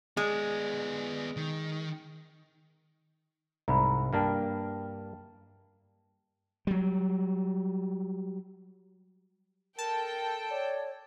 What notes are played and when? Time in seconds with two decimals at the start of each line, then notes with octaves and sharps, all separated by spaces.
0.17 G#3 B3 D5
1.37 D#3
3.68 C2 G#2 A#5 B5
4.13 G2 A#3 D4 G5 A5 F6
6.67 F#3 G3
9.79 A4 A#4 G5 A5
10.51 C#5 D5